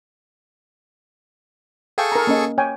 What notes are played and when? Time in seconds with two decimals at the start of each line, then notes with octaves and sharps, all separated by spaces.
1.98 G#4 A4 E5 F5 G5 C#6
2.12 A#4 A#5
2.27 A#3 C#4 D#5
2.58 C#5 G5 G#5